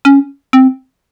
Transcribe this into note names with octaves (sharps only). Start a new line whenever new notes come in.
C#4
C4